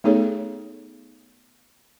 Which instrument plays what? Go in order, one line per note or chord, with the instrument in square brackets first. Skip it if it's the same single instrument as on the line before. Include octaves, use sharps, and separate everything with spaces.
[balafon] A3 B3 D#4 G#4 A4 C#5